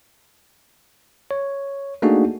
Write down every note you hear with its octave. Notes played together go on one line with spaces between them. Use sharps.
C#5
A3 A#3 D4 D#4 F#4 G#4